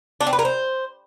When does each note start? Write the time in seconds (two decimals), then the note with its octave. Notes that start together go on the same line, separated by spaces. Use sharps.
0.20 D4
0.27 C4
0.33 B4
0.39 A#4
0.45 C5